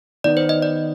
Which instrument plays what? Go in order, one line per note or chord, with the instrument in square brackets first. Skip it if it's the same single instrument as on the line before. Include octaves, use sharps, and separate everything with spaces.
[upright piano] D#3 B3 D#4 B4 [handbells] D5
[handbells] C5
D#5
D5